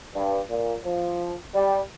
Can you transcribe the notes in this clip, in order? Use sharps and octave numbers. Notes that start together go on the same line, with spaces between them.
G2
A#2
F3
G3